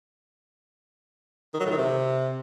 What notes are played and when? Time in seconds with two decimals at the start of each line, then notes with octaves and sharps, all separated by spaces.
1.54 D#3
1.60 F#3
1.66 A2
1.72 D#3
1.77 C3